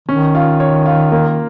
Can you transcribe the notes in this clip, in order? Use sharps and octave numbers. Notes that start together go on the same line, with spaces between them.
D#3 C#4
F4
C#5
F4
A#3